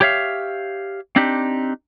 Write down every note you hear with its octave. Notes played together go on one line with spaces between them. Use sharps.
G4 C#5 E5 F5
C4 D4 D#4 G4